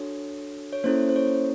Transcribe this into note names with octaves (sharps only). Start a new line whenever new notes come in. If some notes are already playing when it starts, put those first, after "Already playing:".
Already playing: D4 F#4 A4 C#5
C#5
A#3 C#4 E4 A4 C5
C5
C#5